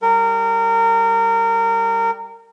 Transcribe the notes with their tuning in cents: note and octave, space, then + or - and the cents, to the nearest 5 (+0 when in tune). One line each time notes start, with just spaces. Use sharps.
G3 +0 A#4 -25